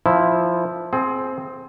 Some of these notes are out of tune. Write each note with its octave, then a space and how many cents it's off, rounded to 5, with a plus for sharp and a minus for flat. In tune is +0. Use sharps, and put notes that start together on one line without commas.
F3 +0 E4 -10
C4 +0 G#4 +30